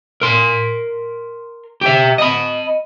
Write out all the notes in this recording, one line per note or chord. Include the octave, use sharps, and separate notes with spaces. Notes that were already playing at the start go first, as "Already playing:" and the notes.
A#4 C6
G4 E5
D#5 B5